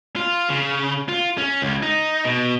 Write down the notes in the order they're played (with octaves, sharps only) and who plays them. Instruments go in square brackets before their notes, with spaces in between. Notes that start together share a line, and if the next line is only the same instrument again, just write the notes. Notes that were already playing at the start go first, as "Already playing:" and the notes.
[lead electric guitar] F4
C#3
F4
C#4
C#2
D#4
B2